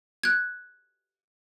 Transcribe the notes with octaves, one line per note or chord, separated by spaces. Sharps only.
F#6 G#6